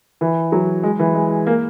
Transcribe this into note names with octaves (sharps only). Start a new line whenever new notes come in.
E3
F#3
G#3
E3
G#3
A#3